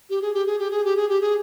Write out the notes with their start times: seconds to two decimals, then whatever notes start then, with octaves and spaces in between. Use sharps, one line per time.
0.09 G4
0.21 G#4
0.33 G4
0.46 G#4
0.59 G4
0.70 G#4
0.84 G4
0.96 G#4
1.08 G4
1.21 G#4